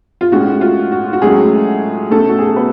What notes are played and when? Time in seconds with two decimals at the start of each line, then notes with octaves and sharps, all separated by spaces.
0.21 F4
0.32 A2 G#3 C#4 F#4
0.61 F4
0.92 F#4
1.13 F#4
1.22 A2 F#3 G#3 A3 C#4 G#4
2.11 B2 A3 C#4 A4
2.29 F#4
2.39 G#4
2.47 A4
2.56 B3 B4